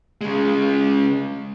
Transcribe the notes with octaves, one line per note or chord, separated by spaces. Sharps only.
C#3 G#3